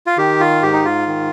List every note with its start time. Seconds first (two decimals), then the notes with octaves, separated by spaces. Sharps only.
0.07 F4
0.18 D#3 G4
0.40 F4
0.63 G#2 G4
0.73 D#4
0.85 F4
1.07 D#3